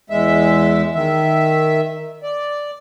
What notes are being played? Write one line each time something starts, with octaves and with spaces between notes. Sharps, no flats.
E2 G#3 E5
D#3 E5
D5